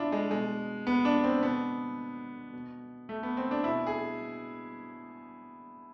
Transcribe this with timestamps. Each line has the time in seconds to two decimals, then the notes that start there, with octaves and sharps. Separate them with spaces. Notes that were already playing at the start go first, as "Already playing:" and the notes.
Already playing: B2 D4 E4 F4
0.12 G#3
0.31 B2 G#3
0.87 B3
1.05 D4
1.24 C4
1.42 B2 B3
2.53 B2
3.09 A3
3.23 B3
3.37 C4
3.51 D4
3.64 B2 E4
3.87 G#4